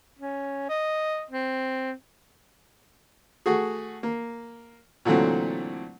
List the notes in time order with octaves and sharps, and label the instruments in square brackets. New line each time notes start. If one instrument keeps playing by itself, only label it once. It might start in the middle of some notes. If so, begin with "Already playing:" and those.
[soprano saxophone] C#4
D#5
C4
[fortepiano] A3 F#4 G#4
A#3
A#2 D3 E3 F#3 A3 C4